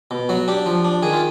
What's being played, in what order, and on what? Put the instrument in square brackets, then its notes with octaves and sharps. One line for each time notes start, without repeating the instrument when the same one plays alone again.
[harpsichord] B2
F#3 F#4
D4 G4
F3
D4
D#3 G#4
F4